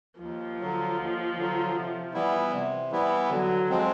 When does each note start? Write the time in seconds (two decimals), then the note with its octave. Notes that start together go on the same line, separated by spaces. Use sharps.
0.20 D#2 F3
0.59 D3 F#3
0.97 D#2
1.37 D3 F#3
1.75 C3
2.14 E3 G3 B3 E4
2.52 C3
2.91 E3 G3 B3 E4
3.30 D3 F#3
3.69 F3 G#3 C4